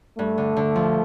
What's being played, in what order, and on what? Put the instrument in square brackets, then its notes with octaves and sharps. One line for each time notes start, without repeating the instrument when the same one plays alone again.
[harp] G2 [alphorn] A3
[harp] D3
D3
F3